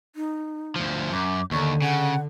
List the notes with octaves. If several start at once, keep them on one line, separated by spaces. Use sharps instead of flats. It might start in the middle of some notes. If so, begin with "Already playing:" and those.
D#4
D2 F3
F#2 D6
D#2 D3 C#6
C#3 F#5